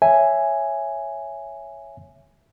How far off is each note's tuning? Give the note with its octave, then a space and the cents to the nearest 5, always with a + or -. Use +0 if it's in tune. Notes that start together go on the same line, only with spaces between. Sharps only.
C#5 +0 E5 +10 G#5 +0